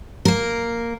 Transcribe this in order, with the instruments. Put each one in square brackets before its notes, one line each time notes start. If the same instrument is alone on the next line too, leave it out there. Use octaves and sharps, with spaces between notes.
[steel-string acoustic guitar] A#3 A#4